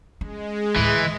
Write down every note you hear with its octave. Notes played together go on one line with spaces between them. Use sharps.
G#3 C#4
D2 A2 E3